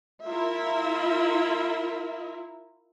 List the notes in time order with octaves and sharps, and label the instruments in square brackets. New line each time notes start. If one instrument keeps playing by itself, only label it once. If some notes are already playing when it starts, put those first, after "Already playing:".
[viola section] E4 F4 A#4 E5